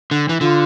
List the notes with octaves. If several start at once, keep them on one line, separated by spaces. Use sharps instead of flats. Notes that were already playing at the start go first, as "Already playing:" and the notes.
D3
E3
D3 F4